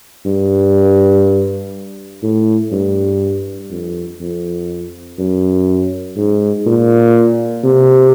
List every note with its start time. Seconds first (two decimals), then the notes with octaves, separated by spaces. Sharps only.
0.26 G2
2.23 A2
2.72 G2
3.71 F2
4.20 F2
5.19 F#2
6.17 G#2
6.66 A#2
7.64 C3